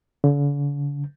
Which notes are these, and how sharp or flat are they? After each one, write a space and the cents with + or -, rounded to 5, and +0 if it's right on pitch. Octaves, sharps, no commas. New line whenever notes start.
D3 -45